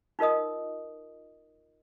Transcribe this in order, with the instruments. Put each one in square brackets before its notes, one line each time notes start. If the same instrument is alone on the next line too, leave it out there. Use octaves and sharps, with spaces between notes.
[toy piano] D#4 F4 A#4 D#5 D#6